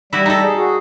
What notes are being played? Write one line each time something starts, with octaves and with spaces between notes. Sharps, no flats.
G3 E4 F#4 G4
D#4 A4
G#4
F#4 G#4